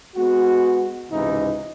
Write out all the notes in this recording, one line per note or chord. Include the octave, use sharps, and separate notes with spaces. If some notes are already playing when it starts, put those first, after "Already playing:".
G#3 B3 F#4
G#1 C#2 C3 E3 D#4